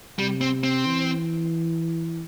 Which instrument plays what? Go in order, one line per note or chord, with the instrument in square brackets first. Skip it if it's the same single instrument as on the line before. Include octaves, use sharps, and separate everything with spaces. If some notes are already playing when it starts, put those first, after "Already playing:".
[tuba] C3 [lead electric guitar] G3
[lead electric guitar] C4
C4
[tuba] E3